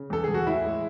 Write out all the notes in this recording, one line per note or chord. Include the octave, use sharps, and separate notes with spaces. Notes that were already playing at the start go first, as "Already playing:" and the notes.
Already playing: C#3
E2 A4
E2 G#4
F#4
A2 E4
G#3